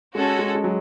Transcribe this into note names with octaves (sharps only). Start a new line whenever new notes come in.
G#3 C#4 F#4 A4
G#3
G#3
F#3